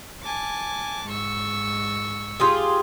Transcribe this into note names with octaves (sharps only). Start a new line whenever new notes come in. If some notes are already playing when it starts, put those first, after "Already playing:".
G#5 A5 D6
G#2 C#6 E6
F4 G4 G#4